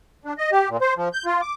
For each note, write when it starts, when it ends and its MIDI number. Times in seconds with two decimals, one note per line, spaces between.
0.25 0.33 62
0.38 0.51 75
0.52 0.69 67
0.69 0.77 46
0.81 0.94 72
0.97 1.09 53
1.13 1.25 91
1.26 1.41 65
1.42 1.55 86